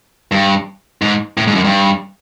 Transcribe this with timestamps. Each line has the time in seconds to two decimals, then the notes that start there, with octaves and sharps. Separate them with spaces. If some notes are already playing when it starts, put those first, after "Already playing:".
0.32 G2
1.02 G#2
1.37 A2
1.47 G#2
1.55 F#2
1.65 G2